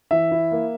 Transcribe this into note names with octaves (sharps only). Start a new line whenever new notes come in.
E3 E5
E4
A#3